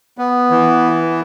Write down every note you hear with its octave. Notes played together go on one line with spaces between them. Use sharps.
B3
E3